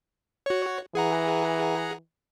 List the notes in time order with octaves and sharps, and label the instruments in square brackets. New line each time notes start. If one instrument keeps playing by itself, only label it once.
[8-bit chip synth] F#4 C#5
[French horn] E3 [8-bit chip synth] G#4 F#5 A#5